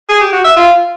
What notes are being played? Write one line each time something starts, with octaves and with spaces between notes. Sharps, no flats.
G#4
G4
F#4
E5
F4